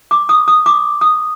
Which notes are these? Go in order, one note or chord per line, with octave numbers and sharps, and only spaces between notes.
D6
D#6
D#6
D6
D#6